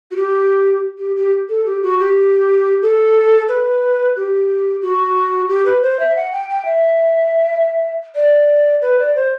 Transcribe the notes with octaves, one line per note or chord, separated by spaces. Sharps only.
F#4
G4
G4
G4
A4
G4
F#4
G4
A4
B4
G4
F#4
G4
B4
C5
E5
F#5
G5
G5
E5
D5
B4
D5
C5